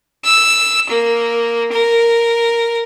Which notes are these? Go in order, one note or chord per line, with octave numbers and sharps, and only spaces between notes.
E6
A#3
A#4